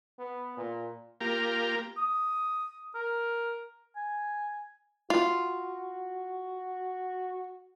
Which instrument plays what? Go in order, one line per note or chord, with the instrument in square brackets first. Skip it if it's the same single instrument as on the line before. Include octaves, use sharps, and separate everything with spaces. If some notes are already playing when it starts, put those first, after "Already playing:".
[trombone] B3
A#2
[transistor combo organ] A#3 F4 G4 A#4
[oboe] D#6
A#4
G#5
[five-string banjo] F4 [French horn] F#4